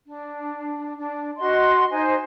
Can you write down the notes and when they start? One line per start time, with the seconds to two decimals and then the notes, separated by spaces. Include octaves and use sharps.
0.06 D4
0.98 D4
1.39 F#4 D#5 C6
1.92 D#4 C5 D#5 G#5